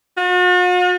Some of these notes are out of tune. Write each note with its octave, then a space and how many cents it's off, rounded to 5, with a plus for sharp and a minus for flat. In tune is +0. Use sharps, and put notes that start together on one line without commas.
F#4 -45